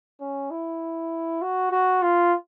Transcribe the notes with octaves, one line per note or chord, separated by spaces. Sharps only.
C#4
E4
F#4
F#4
F4